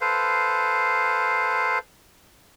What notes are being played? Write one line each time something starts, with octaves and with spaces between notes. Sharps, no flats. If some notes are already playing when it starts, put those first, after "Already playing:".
A4 B4 C5 F5